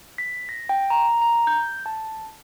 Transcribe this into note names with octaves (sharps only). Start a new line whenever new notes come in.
B6
A#6
G5
A#5
A#5
G6
A5